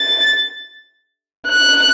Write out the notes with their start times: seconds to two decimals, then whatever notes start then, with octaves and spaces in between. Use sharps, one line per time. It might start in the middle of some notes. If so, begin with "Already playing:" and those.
Already playing: A6
1.49 F#6